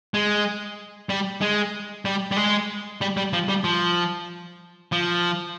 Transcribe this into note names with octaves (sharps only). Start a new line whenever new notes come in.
G#3
G3
G#3
G3
G3
G#3
G3
G3
F3
G3
F3
F3